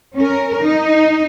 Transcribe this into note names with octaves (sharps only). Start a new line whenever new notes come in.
C#4 A#4
D#4